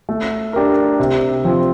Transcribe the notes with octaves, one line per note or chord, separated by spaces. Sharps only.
A3
D4 G4 A#4
C3
F3 C4